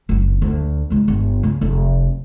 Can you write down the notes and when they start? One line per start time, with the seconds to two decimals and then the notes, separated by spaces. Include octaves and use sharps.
0.09 F#1 F2
0.42 D2
0.90 C#2 G#2
1.08 G1
1.43 C#3
1.61 F1 A3